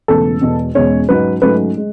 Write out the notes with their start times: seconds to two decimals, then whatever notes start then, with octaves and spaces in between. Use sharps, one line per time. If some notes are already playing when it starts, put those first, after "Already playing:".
0.08 E1 E2 C#3 E3 A3 A4
0.41 E1 E2 B2
0.75 E1 E2 B2 G#3 C#4 C#5
1.09 G#2 F#3 C#4 B4
1.42 G#2 F#3 A3 C#4 B4
1.77 G#3